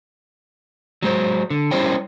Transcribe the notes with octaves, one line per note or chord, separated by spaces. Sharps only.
F#3 G#3 C5
D3
G3 C#4 E4 C5 C#5 G5